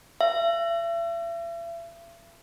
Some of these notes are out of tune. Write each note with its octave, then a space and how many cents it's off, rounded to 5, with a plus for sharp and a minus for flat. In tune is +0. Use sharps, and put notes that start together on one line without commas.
E5 +40